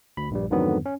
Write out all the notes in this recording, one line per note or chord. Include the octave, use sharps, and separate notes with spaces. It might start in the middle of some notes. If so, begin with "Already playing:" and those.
D2 B5
A#1 G2 G3
F2 G#2 D3 D#3 F#3 B3
C#4